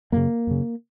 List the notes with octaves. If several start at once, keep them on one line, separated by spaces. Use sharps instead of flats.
F#2 C#3 A#3
F#2 C#3